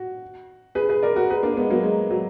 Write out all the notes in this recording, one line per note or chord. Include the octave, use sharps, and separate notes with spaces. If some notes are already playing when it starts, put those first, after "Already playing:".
Already playing: F#4
G#4 B4
G#4 B4
A#4 D5
F#4 A#4
G#4 B4
A#3 D4
G#3 B3
F#3 A#3
G#3
F#3